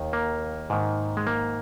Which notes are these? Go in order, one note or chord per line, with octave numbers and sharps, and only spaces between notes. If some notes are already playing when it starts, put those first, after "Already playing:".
Already playing: D#2 D#3
A#3
G#2 D#3
G#3
A#3